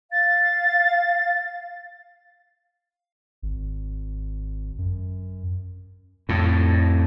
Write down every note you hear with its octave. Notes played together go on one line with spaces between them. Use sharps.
F5 A6
G#1
F#2
F2 A2